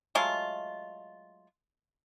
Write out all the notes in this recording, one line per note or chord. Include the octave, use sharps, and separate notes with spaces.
F#3 G#3 A3 F4